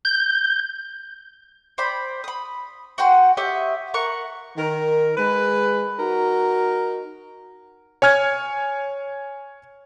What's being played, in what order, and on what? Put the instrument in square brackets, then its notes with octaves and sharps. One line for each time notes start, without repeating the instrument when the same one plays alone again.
[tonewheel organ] G6
[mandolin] C5 D5 G5 B5
B5 D#6
F#4 F#5 G5 C6
G4 C#5 D#5 E5
A#4 F#5 C#6
[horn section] D#3 A#4
G#3 B4
D#4 F#4 A#4
[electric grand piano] C#5 G#5 F6 G#6